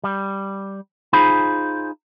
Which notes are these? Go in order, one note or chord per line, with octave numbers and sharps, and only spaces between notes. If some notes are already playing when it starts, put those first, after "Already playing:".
G3
D#4 F4 G#4 C5 B5